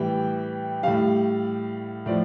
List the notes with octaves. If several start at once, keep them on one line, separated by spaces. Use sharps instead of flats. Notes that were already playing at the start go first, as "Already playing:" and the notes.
Already playing: A2 E3 G3 G5
A2 G3 F5
A2 F3 D5